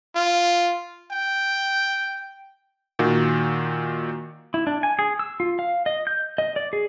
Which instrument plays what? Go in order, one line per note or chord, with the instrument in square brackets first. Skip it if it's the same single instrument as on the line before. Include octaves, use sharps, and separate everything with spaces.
[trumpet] F4
G5
[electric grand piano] A#2 D#3 F#4
[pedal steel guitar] E4
D4
G#5
G#4
E6
F4
F5
D#5
G6
D#5
D5
G#4